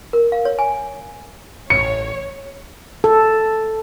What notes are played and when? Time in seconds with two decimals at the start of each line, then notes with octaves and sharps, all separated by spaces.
0.13 A#4
0.32 F5
0.45 C#5
0.59 G#5
1.70 A1 C#5 C#7
3.04 A4